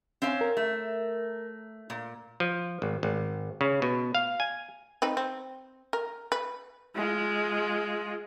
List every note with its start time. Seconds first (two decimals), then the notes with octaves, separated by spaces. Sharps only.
0.22 C4 C#4 F5
0.41 A#4
0.57 A3
1.90 A#2
2.40 F3
2.82 G#1
3.03 G#1
3.61 C#3
3.82 B2
4.15 F5
4.40 G#5
5.02 C4 D#4 B4
5.17 C4
5.93 A#4
6.32 B4
6.95 G#3 F4